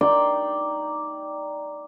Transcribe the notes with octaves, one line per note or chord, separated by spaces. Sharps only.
D#4 D5 G5 C6